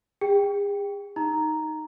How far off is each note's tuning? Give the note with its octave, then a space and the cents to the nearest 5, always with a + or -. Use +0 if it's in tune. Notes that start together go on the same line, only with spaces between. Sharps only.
G#4 -45 G5 +0
D#4 +0 A#5 +0